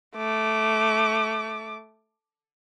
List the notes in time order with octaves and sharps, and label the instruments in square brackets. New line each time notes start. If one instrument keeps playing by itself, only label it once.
[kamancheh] A3 D6